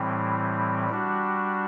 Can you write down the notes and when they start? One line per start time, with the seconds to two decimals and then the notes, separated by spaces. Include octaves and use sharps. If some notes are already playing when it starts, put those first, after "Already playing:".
Already playing: A2 E3 G3 C4
0.89 G3 D4 F#4